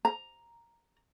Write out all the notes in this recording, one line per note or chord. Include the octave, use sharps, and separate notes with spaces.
A#5